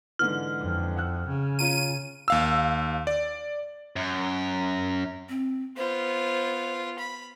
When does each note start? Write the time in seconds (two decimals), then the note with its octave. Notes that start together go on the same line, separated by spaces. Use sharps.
0.19 G#2 D3 E3 F6
0.59 F2
0.97 F#5 E6 F#6
1.28 C#3
1.59 C#4 F4 A#5 D#7
2.28 D#2 F5 E6
3.07 D5
3.96 F#2
5.29 C4
5.77 B3 F4 C5
6.99 B5